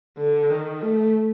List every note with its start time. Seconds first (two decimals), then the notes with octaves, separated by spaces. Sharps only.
0.18 D3
0.51 D#3
0.83 A3